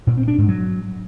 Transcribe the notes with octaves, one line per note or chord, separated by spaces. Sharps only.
A#2
C4
D4
G#2
F#3